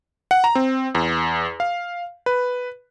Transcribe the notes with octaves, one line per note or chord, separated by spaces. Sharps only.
F#5
A#5
C4
E2
F5
B4